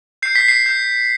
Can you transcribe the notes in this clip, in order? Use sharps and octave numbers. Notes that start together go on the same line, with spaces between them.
G6 C7
B6
C7
G6